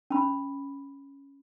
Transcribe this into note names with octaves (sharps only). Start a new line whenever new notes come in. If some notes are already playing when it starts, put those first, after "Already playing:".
C#4 B5